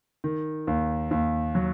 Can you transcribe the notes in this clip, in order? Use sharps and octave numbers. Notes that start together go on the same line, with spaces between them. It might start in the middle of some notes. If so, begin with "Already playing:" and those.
D#3
D#2
D#2
F#3